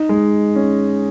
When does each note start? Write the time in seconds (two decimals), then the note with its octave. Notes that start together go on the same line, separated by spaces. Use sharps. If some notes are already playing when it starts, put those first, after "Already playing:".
Already playing: D#4
0.09 G#3
0.56 C#4